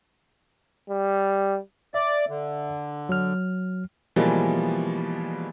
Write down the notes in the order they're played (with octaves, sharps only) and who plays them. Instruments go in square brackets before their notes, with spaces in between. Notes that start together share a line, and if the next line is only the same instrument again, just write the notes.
[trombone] G3
[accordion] D5 [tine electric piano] E5
[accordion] D3
[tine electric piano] F#3 F6
[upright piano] B2 E3 F3 G3 G#3 A#3